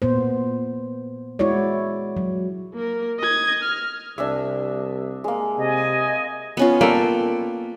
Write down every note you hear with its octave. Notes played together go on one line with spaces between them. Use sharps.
A#2 B3 C5
G#3 E4 F#4 C#5 D5
F#3
A#3 A#4
D#5 G#6
F6
C2 D4 D#5 E5
G#3 A#3
C3 D#5 G#5
B3 C#4 F4
A#3 A4 B4 D5 G5